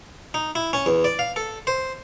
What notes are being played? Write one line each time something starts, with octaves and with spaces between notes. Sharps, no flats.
D#4
E4
C#4
E2
D5
F5
A4
C5